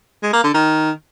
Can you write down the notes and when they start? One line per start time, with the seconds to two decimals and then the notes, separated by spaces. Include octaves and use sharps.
0.23 G#3
0.33 A#3
0.44 D3
0.54 D#3